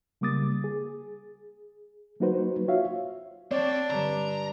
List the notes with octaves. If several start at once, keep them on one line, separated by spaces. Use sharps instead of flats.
C#3 G3 A#3 D6 D#6 A6
G#4
F#3 A#3 D#4 F#4 B4 C5
F4 F#4 C#5 E5 F5
C4 D4 C#5 D5
G2 D3 A#5